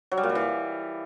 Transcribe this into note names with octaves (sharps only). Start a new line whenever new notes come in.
F#3
G3
A#2
G3
E3